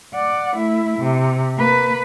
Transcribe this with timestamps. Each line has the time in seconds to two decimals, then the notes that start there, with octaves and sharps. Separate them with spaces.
0.14 D5 F#5
0.56 A3 E4
0.99 C3
1.56 A#3 B4